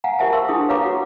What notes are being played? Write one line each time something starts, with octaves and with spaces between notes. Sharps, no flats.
F5 F#5 G#5 A#5
G4 A#4 C5 E5 F#5 A5
F5 C6 C#6 E6
D4 E4 G#4 C#6 D#6
G4 B4 C#5 F5 A#5 D6
F#4 F#5